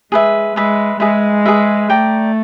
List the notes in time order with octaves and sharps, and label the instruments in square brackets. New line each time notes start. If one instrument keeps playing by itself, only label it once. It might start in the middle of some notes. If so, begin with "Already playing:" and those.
[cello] G#3 [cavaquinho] G#4 B4 E5
[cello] G#3 [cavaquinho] G#4 B4 E5
[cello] G#3 [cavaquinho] G#4 B4 E5
[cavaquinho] G#4 B4 E5
[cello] A3 [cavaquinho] D5 G5 A#5